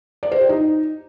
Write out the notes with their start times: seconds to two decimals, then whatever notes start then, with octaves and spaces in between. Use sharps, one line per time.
0.23 D5
0.32 C5
0.40 G4
0.49 D#4